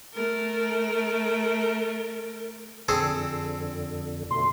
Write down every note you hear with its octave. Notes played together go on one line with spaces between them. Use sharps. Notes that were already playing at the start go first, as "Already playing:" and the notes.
A3 A#4
F2 D3 C4 G#4 A4
B2 D3 A3 C6